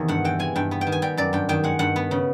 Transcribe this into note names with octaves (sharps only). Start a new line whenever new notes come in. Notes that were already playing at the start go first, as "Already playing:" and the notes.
Already playing: E2 C3 D#3
G2 F#5
E3 G5
G#3 G#5
G2 G5
B3
G5
D#3
G#5
G3 G5
F#2 D5
G2 G5
D#3 G5
G#3 F#5
G2 F#5
B3
C#3